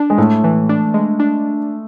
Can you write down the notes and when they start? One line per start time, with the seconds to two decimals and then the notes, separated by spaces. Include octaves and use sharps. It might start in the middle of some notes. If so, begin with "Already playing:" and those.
Already playing: D4
0.10 G#3
0.18 A2 A3
0.44 E3
0.69 D4
0.94 G#3
1.20 D4